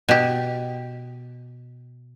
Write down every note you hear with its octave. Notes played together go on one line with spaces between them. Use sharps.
B2 G4